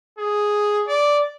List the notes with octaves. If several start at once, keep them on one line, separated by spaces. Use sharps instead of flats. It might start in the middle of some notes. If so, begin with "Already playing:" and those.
G#4
D5